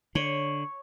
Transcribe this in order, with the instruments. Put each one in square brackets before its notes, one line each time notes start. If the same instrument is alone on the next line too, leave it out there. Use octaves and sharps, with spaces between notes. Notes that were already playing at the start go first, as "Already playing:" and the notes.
[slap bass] D3 [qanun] C#5